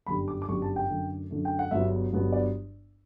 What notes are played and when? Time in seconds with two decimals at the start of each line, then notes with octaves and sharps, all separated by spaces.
0.07 G1 F#2 D3 G3 B5
0.28 D6
0.42 D6
0.48 G1 F#2 D3 G3 C#6
0.62 A5
0.76 G5
0.89 F#2 D3 A3
1.31 F#2 D3 A3
1.45 G5
1.59 F#5
1.71 G1 G2 F#3 B3 E5
2.12 G1 G2 F#3 B3
2.32 D5